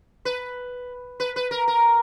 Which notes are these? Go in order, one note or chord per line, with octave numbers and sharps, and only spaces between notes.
B4
B4
B4
A#4
A#4